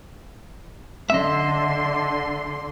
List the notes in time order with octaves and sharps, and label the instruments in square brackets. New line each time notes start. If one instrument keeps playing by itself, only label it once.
[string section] D3 C6 [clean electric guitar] D#5 E5